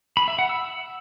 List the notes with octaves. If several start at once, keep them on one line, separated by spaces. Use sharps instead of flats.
B5
E5
F#5
E6